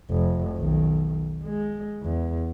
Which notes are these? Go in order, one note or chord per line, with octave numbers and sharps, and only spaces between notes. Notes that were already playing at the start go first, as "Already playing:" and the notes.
F1
B1 D#3
G#3
E2